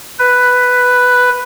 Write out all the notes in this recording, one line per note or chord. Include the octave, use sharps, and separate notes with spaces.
B4